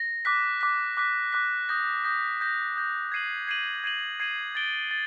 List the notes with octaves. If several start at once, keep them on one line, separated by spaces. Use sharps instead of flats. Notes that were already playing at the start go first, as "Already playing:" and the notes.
Already playing: A#6
D6 F#6 B6
D6 F#6 B6
D6 F#6 B6
D6 F#6 B6
D#6 G6 A#6
D#6 G6 A#6
D#6 G6 A#6
D#6 G6 A#6
G#6 C7 D#7 F#7
G#6 C7 D#7 F#7
G#6 C7 D#7 F#7
G#6 C7 D#7 F#7
A6 D7 G7
A6